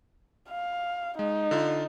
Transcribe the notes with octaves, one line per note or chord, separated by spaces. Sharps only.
F5
G#3 D#4
D3 F4